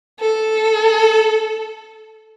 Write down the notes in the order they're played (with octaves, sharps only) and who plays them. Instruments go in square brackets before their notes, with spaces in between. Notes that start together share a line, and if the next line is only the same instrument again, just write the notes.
[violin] A4